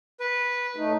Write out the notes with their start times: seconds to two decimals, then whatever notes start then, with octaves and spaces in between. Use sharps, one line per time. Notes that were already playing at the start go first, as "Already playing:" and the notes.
0.20 B4
0.76 A2 A3 D#4